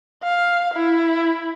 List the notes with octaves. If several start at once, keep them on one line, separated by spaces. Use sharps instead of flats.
F5
E4